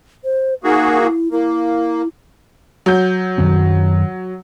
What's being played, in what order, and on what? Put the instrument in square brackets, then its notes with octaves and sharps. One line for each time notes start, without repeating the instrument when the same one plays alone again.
[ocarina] C5
[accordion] A#3 F#4 G#4 [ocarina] D#4
[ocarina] E4
[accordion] A#3 [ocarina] E4
[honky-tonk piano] F#3 G6
[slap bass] F#2 D#3 C4